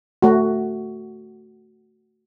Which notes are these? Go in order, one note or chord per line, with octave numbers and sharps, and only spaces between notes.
A3 F#4